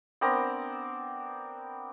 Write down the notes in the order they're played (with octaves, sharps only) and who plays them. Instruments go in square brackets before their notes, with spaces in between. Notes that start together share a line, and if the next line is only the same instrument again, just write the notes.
[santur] B3 C4 D4 A#4